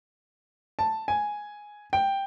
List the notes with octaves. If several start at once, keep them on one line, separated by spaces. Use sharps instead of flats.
A5
G#5
G5